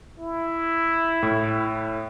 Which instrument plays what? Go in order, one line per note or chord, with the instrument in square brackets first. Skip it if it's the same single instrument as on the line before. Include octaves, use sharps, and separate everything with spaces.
[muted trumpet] E4
[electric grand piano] A2